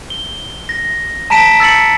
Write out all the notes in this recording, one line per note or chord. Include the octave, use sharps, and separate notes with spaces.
G7
A#6
A5 A#5 B6 D7 E7
E6 A6 C#7 F#7